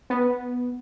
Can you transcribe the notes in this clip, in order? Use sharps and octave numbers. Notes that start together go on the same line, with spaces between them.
B3